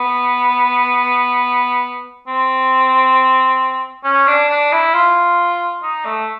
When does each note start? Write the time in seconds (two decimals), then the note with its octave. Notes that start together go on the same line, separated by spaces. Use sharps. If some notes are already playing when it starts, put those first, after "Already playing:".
Already playing: B3
2.27 C4
4.04 C#4
4.27 D4
4.49 D4
4.72 E4
4.93 F4
5.83 D#4
6.05 A3